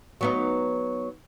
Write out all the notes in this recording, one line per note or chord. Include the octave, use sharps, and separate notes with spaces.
F#3 B3 D#4